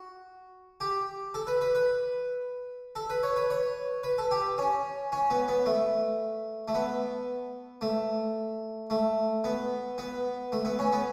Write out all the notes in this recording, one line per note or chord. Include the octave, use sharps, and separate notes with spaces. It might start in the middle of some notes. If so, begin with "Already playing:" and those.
Already playing: F#4
G4
A4
B4
B4
B4
A4
B4
C#5
B4
C#5
B4
A4
G4
C#4
C#4
B3
B3
A3
A3
B3
A3
A3
B3
B3
A3
B3
C#4
B3